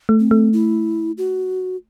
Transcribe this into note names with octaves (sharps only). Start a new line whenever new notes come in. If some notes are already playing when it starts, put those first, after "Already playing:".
A3
C4
A3
E4
F#4